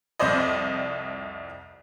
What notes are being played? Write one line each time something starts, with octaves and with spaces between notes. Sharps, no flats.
C2 F2 C5 D5 D#5